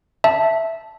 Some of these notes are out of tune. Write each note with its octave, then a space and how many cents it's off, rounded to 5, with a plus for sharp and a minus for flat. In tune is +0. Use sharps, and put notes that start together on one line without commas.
E5 +0 A5 +0